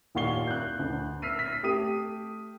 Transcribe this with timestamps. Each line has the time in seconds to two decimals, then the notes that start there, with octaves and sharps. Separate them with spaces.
0.15 D#2 A#2 F#5 C#6 C7 G7
0.47 F#6 G6
0.79 D2
1.22 E6 F6 B6 C7 D#7
1.39 B6
1.63 A3 G4 D#6 D#7